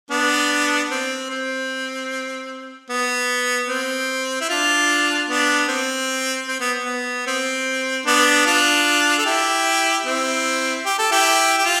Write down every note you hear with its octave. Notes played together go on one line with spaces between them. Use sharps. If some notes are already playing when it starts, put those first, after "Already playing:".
B3 D4
C4
C4
B3
C4
E4
D4 F4
B3 D4
C4
C4
B3
B3
C4
B3 D4
D4 F4
A4
E4 G4
C4 E4
G4
A4
E4 G4
G4
F4